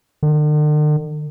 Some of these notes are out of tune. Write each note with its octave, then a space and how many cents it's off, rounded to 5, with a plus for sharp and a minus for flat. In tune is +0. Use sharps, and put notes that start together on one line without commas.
D3 +45